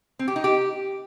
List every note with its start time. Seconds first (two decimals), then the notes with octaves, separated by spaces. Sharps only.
0.19 C4
0.28 G4
0.36 D#4
0.44 G4